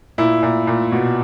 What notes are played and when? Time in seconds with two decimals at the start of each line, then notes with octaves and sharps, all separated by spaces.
0.18 A#2 E4
0.43 A#2
0.67 A#2
0.92 B2